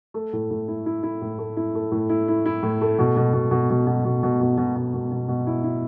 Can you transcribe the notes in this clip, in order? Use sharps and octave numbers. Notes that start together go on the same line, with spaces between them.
A3
A2
A2
E4
E4
E4
A2
A3
E4
A3
A2
E4
E4
E4
A2
A3
B2
B2
B2
B2
B2
B2
B2
B2
B2
B2
B2
B2
B2
B2
E4
E4